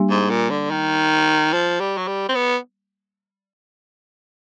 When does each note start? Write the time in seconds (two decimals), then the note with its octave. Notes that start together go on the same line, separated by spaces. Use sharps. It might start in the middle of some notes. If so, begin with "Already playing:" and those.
Already playing: G3 A#3 D4 G4
0.10 G#2
0.30 A#2
0.50 D3
0.71 D#3
1.53 F3
1.80 G3
1.97 F#3
2.08 G3
2.29 C4
2.35 B3